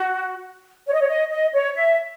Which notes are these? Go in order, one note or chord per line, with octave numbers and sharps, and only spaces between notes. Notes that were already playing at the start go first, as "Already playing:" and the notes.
Already playing: F#4
C#5
D#5
C#5
D#5
D#5
C#5
E5